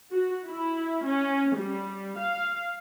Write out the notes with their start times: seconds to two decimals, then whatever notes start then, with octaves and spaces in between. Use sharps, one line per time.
0.11 F#4
0.47 E4
1.05 C#4
1.56 G3
2.17 F5